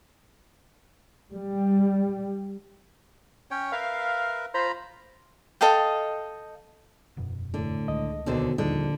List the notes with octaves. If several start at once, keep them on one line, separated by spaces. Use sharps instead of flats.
G3
C#4 C#5 G5
A#4 B4 E5 F5
F4 C5 A#5 B5
A4 D#5 F5 G5
E1 F#2 B2
A2 D3
C#2 D#3 G#3 D#5
D#2 B2 D3 C5
A#1 D#2 D3 G3 D4 D#4